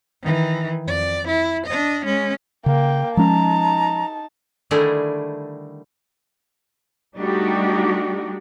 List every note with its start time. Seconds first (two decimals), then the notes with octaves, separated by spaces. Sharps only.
0.22 D#3 E3
0.85 F2 D5
1.28 E4
1.66 D4 D#5
2.05 G#3 C#4
2.66 C#3 A#3 G5
3.17 F3 G#3 C#4 D#4 A5 A#5
4.71 D3 D#3 G3 A3 E4 G#4
7.19 G3 A3 D4 D#4 F#4 G4